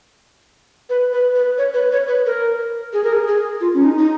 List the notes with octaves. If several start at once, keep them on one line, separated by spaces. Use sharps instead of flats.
B4
B4
B4
C#5
B4
C#5
B4
A#4
G#4
A#4
G#4
G#4
F4
C#4
D#4
D#4